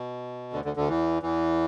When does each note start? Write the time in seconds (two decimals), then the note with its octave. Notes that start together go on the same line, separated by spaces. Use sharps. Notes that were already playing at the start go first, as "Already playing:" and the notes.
Already playing: B2
0.53 D2 D3
0.65 D2 D3
0.76 D2 D3
0.88 E2 E3
1.23 E2 E3